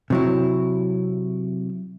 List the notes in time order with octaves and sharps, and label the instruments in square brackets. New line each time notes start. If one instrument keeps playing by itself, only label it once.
[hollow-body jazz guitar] C3 F#3 E4